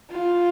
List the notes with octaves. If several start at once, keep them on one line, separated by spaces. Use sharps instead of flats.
F4